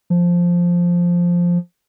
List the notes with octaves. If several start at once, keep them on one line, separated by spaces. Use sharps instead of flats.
F3